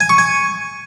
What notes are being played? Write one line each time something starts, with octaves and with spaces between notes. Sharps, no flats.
G#5
C#6
G#5